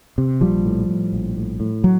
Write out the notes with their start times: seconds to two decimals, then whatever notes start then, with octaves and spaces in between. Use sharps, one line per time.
0.18 C3
0.41 A#1 F3 G3
0.65 A2
0.89 A2
1.13 A#1
1.36 A2
1.60 A2
1.84 F#3